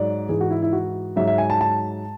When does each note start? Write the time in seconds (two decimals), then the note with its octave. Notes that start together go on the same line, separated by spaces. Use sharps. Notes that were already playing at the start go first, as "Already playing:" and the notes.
Already playing: G#2 F#3 D5
0.29 G#2 E3 G#4
0.41 F#4
0.51 E4
0.62 E4
0.73 F#4
1.16 G#2 F#3 E5
1.27 E5
1.38 G#5
1.50 A5
1.61 A5